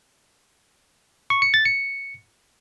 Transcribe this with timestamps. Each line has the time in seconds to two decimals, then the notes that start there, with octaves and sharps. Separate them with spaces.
1.30 C#6
1.42 C#7
1.54 A6
1.65 C#7